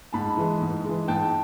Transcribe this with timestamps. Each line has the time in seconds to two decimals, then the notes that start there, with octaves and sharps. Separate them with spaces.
0.13 G#2 A5 B5
0.37 E3 G#3
0.61 G#2
0.84 E3 G#3
1.08 G#2 G5 A5